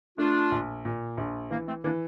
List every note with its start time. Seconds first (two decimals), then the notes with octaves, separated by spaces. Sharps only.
0.18 A3 D4 F4
0.52 A#1
0.85 A#2
1.18 A#1
1.50 E3 A#3
1.67 A3 C4
1.84 E3 A#3 D4